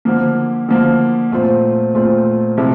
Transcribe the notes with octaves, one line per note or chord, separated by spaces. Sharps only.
D3 F3 A#3
D3 F3 A#3
A#2 A3 C4 F4 C5
A#2 A3 C4 F4 C5
C3 F3 A3 E4